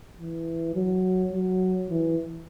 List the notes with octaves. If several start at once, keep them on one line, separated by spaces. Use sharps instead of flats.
E3
F#3
F#3
E3